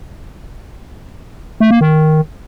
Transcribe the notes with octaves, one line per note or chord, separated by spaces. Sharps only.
A3
A#3
D#3